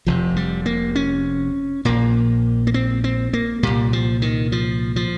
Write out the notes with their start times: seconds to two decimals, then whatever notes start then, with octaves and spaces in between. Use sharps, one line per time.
0.07 F1 F2 C3 F3
0.36 G3
0.66 A#3
0.96 C#4
1.85 A#1 A#2 A#3
2.67 A#3
2.74 C4
3.04 C4
3.33 A#3
3.63 C2 A#2 G3
3.93 F3
4.22 D#3
4.52 F3
4.96 F3